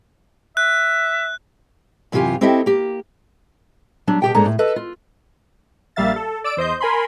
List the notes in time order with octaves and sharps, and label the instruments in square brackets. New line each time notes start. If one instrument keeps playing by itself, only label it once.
[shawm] E5 [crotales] F#6
[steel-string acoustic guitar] F#2 C3 E3 F4 G4 G#5
C4 E4 G4 A4 D#5 E5
A#3 G4
F#3 G3 D4
B2 G4 G5
G#2 G#3 A#3 D4 A4 A#5
A2
A4 B4 D#5
F4
[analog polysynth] A#1 G3 A#3 E5 F5 A6
A4
D5 E6 D7
E2 C5 D#5 G6
A#4 G#5 B5 C6